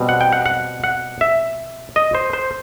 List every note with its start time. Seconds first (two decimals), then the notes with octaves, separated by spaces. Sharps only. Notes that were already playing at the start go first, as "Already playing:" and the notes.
Already playing: B2 G3 C4
0.09 F#5
0.21 G5
0.32 F#5
0.46 F#5
0.84 F#5
1.21 E5
1.96 D#5
2.15 C5
2.33 C5